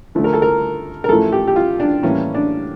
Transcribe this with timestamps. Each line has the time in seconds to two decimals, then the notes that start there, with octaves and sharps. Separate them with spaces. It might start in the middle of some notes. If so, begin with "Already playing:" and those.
0.15 D2 D3 F3 A3
0.24 A#4
0.33 A4
0.42 A#4
1.04 A#4
1.08 A1 A2 F3 A3 A4
1.32 G4
1.48 G4
1.56 F4
1.80 D4
2.03 A2 E3 G3 A#3 C#4
2.34 D4